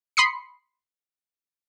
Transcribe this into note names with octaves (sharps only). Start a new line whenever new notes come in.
B5 C6 D#6 C7 C#7